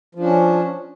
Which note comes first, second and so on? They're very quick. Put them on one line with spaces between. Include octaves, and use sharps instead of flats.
F3 D4 C#4